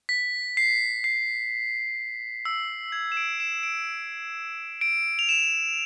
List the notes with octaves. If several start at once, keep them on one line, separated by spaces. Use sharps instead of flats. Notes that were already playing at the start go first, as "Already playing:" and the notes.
B6
C7
C7
E6
G#6
E7
D7
E7
D7
D7
F7
E7